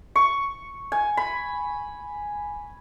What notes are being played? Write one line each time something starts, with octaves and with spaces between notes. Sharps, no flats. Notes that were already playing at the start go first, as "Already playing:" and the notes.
C#6
G#5
B5